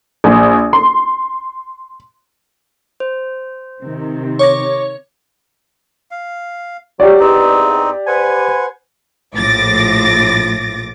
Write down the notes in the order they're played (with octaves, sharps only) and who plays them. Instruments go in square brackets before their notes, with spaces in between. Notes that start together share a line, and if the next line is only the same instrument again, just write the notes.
[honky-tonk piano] A#1
C6
[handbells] C5
[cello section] C3 D#3 C4
[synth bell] C#5 [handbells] C#6 D6 A#6
[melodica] F5
[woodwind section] F#3 [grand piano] G4 D5
[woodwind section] E2 [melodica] C4 D#4
[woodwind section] B4 C5 G#5 [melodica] F#5
[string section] A#1 A2 F3 D6 A6 A#6